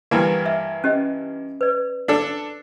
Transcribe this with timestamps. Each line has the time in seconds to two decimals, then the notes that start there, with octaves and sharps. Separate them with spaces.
0.11 G2 E3 A#3 D5 G5
0.46 E5
0.84 C#4 G4 D#5
1.61 B4 D5
2.08 D4 A4